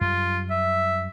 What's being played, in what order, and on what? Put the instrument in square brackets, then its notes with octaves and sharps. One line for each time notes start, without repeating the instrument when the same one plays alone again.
[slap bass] F#2 G3 [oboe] F4
[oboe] E5